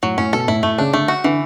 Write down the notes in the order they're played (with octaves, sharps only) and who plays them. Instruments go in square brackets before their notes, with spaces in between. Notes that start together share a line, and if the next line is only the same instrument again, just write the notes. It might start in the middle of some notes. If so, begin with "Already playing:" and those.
[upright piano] A2 [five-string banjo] F#3
[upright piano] A2 [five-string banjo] C#4
[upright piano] B2 [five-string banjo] A4
[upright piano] A2 [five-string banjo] E4
[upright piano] A2 [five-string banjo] A3
[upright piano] C#3 [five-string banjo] D4
[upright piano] D3 [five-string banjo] A3
[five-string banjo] F#4
[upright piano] D3 [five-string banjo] E3